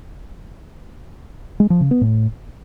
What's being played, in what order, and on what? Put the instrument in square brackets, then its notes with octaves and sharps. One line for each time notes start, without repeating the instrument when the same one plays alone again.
[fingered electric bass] G#3
F3
C#3
B3
A2